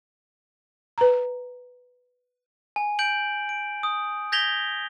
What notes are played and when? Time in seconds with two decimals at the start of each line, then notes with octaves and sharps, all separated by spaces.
0.98 B4 A#5
2.76 G#5
2.99 G6 D7 F#7
3.49 D7
3.83 D#6
4.32 G6 G#6 A#6 B6 F7 G7